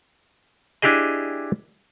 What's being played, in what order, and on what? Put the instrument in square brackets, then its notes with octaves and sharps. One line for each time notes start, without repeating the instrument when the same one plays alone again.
[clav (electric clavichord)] D4 E4 G4 G#4 D#5